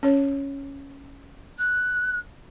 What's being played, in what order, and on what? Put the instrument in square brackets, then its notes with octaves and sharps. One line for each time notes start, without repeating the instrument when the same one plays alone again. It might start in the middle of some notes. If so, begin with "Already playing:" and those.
[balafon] C#4 C#5
[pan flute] F#6